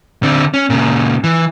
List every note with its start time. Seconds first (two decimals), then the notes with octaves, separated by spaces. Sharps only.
0.23 D3 C4
0.54 C#4
0.70 A#2 C#3
1.24 E3